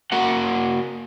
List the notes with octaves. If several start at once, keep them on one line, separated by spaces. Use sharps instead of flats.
A#3 F#4 F#5